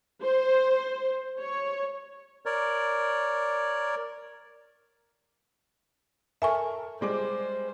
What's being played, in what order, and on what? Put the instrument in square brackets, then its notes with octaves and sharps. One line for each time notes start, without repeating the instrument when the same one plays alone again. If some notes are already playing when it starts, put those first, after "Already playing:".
[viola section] C5
C#5
[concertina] A#4 C#5 D5
[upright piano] A4 A#4 [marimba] E5 G#5 C#6
[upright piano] G3 G#3 D6 [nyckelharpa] C5